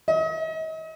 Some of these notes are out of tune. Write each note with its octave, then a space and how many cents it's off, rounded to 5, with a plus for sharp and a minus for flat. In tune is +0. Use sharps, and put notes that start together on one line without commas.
D#5 +40